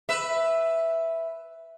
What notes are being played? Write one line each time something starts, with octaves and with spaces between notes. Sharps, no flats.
B4 E5